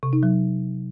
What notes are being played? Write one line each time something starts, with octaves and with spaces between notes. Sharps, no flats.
C3
D#4
F#3